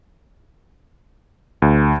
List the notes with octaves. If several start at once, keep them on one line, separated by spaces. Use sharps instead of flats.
D2